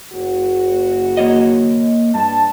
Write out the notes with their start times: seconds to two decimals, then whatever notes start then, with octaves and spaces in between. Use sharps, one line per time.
0.12 F#1 C#3 F#4
1.17 A#3 C#5 D#5
2.15 G2 A5